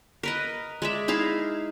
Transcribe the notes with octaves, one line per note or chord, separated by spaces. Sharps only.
A#4 B4 D#5
G#3 D5 E5
D#4 E4 G#4 F5